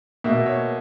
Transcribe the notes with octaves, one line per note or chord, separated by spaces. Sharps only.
B2 A#3 E5
C#5